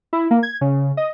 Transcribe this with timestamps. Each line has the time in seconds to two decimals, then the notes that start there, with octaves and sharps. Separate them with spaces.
0.13 E4
0.31 A#3
0.43 G#6
0.61 C#3
0.97 D#5